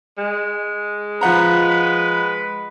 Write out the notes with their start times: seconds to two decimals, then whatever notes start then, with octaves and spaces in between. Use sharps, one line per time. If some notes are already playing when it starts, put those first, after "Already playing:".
0.18 G#3
1.21 F3 B4 F#5 A#5